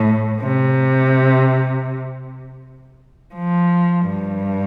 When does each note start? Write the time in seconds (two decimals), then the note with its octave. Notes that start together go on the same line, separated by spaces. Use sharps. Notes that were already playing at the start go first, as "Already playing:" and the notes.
Already playing: A2
0.42 C3
3.35 F3
4.09 G2